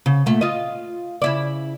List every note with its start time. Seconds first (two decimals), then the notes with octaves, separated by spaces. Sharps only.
0.06 C#3
0.26 A#2 A3
0.41 F4 D#5
1.22 C#3 E4 D5